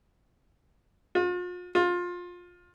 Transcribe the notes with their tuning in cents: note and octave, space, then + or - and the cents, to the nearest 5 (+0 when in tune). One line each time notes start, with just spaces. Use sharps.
F4 +40
F4 +20